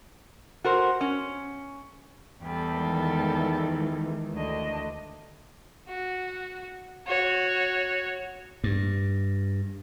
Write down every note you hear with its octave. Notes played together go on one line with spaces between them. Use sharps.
F#4 A#4 C5
C#4
E2 G3 A4
D#3 E3 G#3
D2 D4 D#5
F#4
F#4 C#5
G2